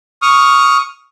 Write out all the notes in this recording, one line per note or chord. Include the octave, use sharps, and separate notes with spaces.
C#6 D#6 F6